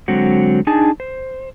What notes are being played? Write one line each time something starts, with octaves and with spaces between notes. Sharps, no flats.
D3 F#3 G#3 C4 F#4
D4 D#4 G#4 G#5 A5
C5